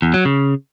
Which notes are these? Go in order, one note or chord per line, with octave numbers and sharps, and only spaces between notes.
E2
F#3
C#3